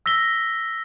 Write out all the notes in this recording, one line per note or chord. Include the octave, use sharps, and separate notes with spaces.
E6 A#6 B6 G7